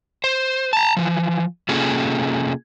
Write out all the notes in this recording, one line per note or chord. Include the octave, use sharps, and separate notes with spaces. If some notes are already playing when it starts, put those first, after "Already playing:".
C5
A5 A#5
E3 F3
C3 A#3 C#4 F4 G#4 A4